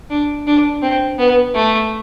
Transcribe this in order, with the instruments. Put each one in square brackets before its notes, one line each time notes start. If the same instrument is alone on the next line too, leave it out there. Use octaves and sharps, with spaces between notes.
[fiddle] D4
D4
C4
B3
A3